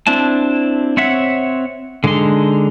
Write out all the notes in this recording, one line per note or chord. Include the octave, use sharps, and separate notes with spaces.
C4 D4 E4 A5
C4 C#5 E5 F#5
D3 G#3 D4 D#4 C6